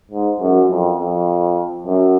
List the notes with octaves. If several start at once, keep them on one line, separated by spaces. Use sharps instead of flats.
G#2
F#2
F2
F2
F#2